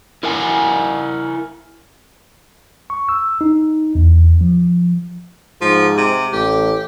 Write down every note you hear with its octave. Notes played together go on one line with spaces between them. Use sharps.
E4 A#4 F#5 G#5
C#6
E6
D#4
E2
F3
G#2 F3
C3
A1 G4